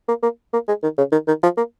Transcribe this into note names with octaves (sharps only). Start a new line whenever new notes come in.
A#3
A#3
A#3
G#3
D#3
C#3
D#3
D#3
F3
A#3